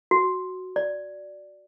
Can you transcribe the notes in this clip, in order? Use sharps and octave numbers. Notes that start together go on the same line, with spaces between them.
F#4
D5